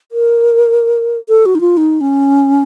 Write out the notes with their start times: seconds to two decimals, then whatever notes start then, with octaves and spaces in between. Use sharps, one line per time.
0.12 A#4
1.29 A4
1.46 F#4
1.55 D#4
1.61 F4
1.77 D#4
2.01 C#4